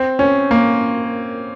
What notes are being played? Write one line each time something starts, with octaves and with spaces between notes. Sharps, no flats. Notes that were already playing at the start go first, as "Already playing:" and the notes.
Already playing: C4
C#4
A#3